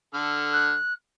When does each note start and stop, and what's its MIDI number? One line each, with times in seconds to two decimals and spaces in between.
0.14 0.76 50
0.14 0.76 69
0.14 0.76 89
0.53 0.93 90